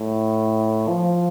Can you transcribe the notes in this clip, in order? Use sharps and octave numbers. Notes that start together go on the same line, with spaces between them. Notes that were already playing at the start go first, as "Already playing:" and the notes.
Already playing: A2
F3